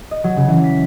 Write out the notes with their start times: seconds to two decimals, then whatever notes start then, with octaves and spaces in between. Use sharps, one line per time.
0.11 D#5
0.24 F#3
0.36 C#3
0.48 E3
0.64 B6